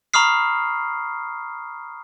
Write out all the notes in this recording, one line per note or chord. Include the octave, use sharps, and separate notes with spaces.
A#5 B5 C#6 D#6 F6 C7